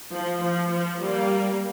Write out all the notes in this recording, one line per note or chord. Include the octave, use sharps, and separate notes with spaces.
F3
F3
F3
G3 A#3